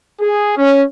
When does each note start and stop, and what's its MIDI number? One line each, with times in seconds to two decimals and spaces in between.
0.19 0.55 68
0.56 0.82 61